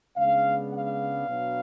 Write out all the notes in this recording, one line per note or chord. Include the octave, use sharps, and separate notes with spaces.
C#3 G#3 B3 D4 F5
F5
B2 F#3 B3 D4